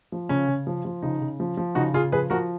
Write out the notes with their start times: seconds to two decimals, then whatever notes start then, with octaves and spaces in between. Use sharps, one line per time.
0.12 F3
0.29 C#3 C#4
0.48 C#3
0.67 F3
0.85 F3
1.02 C#3 D#4
1.22 C#3
1.40 F3
1.57 F3
1.75 C#3 D#4 F#4
1.93 C#3 F4 G#4
2.12 F3 G#4 B4
2.30 F3 F#4 A#4